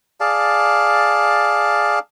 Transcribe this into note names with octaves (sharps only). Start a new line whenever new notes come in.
G#4 D5 F5 A5